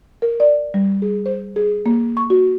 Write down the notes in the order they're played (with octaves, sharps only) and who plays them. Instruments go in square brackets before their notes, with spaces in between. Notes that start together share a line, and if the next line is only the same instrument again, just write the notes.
[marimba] A#4
D5
G3
G#4
C5
G#4
A#3
C#6
F#4